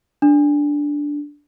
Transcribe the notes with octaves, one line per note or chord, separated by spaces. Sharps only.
D4